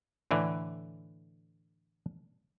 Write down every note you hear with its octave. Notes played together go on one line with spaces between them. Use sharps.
A2 D3 E3